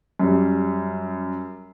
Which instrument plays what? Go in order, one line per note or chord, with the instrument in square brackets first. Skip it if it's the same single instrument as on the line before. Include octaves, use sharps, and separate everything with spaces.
[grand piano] F#2 G3